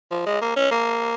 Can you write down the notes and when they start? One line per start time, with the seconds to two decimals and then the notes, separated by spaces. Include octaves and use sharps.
0.11 F3
0.26 G#3
0.41 A#3
0.56 C#4
0.71 A#3